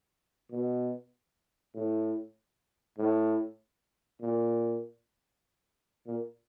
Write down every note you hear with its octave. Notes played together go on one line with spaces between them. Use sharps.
B2
A2
A2
A#2
A#2